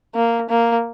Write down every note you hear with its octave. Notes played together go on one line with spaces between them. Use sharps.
A#3
A#3